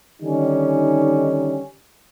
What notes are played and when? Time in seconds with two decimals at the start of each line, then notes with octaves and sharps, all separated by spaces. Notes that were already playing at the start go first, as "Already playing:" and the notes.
0.22 D3 D#3 G3 C#4 D#4